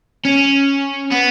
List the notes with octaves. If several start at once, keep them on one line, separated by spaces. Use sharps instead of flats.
C#4
B3